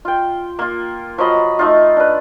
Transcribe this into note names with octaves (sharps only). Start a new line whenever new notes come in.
F4 G5
A#3 F4
F3 F#3 D#5 B5
A3 D#4 F4
D4 B4